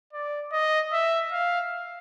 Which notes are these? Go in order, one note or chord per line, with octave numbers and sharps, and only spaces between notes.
D5
D#5
E5
F5